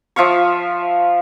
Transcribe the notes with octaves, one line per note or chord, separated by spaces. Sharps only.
F3 E5 F5 C#6